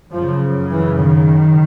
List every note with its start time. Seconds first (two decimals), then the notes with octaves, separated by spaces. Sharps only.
0.12 F#2 C#3 F3
0.70 E3
0.99 D#3